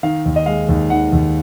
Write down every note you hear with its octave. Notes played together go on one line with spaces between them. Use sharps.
D#3 F5
D#2
D#5
G#3 F5
D#2
D#3 F#5
D#2